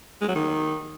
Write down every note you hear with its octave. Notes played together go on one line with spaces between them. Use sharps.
G#3
F#3
D#3